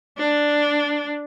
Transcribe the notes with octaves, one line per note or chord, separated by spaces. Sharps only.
D4